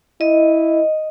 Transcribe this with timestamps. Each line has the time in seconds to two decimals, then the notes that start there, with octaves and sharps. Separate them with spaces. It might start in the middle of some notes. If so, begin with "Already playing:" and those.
0.21 E4 D#5